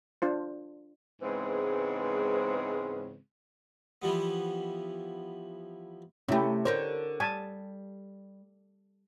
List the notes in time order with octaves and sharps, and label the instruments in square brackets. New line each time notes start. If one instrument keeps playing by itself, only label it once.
[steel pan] D4 F4 C5
[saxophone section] G#2 C#3 E3 G#3 B3 C4
[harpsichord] E3 F3 G3 B3
[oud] C3 A3 [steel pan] C#4 E4 G4
[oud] D3 A#4 C#5 [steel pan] C5
[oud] G3 [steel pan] G#5 A5